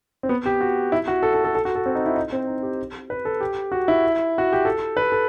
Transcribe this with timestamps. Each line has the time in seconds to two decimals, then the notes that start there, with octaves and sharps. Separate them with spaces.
0.23 C4
0.29 B3
0.46 G4
0.61 F#4
0.92 E4
1.08 F#4
1.23 A4
1.34 A4
1.44 A4
1.55 A4
1.65 F#4
1.75 A4
1.86 C4
1.95 D#4
2.06 E4
2.16 D#4
2.32 C4
2.47 D#4
2.63 G4
3.10 B4
3.25 A4
3.41 G4
3.72 F#4
3.88 E4
4.38 F#4
4.53 G4
4.65 A4
4.97 B4
5.12 A4